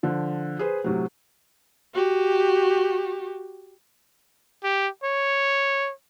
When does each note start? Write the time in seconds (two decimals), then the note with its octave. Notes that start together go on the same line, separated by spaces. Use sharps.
0.03 D3 F3
0.59 G#4 B4 C5
0.84 A2 C3 F#3
1.94 F#4 G4
4.64 G4
5.04 C#5